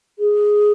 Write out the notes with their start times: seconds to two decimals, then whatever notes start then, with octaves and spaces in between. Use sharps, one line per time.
0.19 G#4